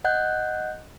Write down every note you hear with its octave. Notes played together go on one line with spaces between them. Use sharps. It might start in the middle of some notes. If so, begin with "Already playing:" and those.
D#5 F#5 F#6 G6